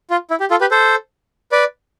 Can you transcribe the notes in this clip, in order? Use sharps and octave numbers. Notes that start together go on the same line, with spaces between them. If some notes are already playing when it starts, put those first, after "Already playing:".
F4
E4
G4
F4 A4
G4 B4
A4 C5
B4 D5